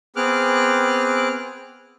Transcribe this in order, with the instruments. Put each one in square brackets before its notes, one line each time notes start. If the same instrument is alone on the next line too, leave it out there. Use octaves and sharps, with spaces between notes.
[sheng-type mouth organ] B3 C4 G#4 D6 F6 F#6